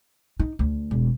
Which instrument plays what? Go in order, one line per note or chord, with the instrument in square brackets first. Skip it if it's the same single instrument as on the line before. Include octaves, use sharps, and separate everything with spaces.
[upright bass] D#4
D2
E1